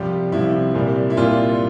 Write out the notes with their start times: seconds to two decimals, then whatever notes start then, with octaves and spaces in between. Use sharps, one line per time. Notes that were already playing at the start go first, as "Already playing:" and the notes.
Already playing: C2 C3 F3 G3 C4 G4
0.32 C2 C3 F3 C4 E4
0.74 C2 A#2 G3 A#3
1.10 E4
1.17 C2 A#2 G3 A#3 F4